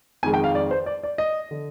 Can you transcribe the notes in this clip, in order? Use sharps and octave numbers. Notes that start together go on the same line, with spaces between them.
F2 D#3 G#3 G#5
G5
F5
D5
C5
D5
D5
D#5
D3